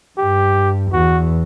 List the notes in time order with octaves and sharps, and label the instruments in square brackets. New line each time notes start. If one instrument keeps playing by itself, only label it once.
[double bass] G2 [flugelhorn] G4
[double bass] E2 [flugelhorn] F#4